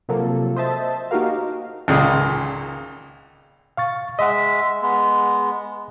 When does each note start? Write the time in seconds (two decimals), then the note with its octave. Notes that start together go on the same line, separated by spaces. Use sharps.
0.09 C3 F3 F#3 A#3 F4 A4
0.56 C5 D#5 E5 A5
1.11 A#3 D#4 F#4 G4 A#4 F5
1.88 G#1 C#2 A#2 C#3 G#4 D#6
3.77 F5 C#6 A6
4.19 G#3 D#5 E5 F#5
4.82 G#3 B3